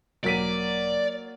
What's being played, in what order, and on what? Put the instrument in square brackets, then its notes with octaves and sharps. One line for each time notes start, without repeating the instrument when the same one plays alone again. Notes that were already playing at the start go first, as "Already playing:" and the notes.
[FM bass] E1 [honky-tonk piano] F#3 [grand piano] A#3 B6 D#7 [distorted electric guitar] D5